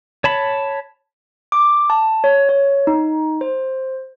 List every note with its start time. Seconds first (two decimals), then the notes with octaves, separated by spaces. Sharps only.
0.24 C#5 A5 B5
1.52 D6
1.90 A5
2.24 C#5
2.49 C#5
2.87 D#4
3.41 C5